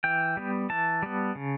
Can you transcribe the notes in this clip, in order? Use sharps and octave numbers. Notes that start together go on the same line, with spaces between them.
E3 G5
G3 B3
E3 A5
G3 B3
C#3